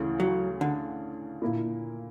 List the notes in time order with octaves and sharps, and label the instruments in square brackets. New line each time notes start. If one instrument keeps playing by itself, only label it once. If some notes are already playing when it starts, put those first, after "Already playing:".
Already playing: [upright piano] D2 C#3 E3
[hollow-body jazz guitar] F#3
D3
[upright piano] A#2 A#3 E4